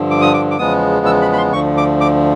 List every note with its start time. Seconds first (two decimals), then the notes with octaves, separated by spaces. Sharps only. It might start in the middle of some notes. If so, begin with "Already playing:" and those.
Already playing: G2 D3 F3
0.11 D6
0.21 D#6
0.34 D6
0.51 D6
0.58 E2 C#3 F3 G#3 B3 D#6
1.06 E6
1.22 B5
1.33 B5
1.37 C6
1.53 D2 D3 F3 C#6
1.77 D6
2.01 D6